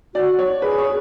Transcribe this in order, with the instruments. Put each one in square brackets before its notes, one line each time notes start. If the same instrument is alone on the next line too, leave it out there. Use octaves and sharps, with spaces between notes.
[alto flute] F#4 [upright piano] D5
[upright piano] C#5
[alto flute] G#4 [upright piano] B4
[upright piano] C#5